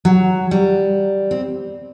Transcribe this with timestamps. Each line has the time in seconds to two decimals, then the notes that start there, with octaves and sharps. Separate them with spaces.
0.05 F#3
0.51 G3
1.31 C4